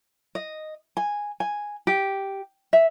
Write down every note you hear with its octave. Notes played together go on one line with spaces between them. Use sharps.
D#5
G#5
G#5
G4
E5